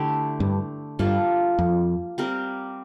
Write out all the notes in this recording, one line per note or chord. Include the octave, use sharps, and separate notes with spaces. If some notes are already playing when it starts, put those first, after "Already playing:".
Already playing: D3 A3 E4 G4
G2
G2 G3 A#3 F4 A4
F2
G3 C4 G4 A#4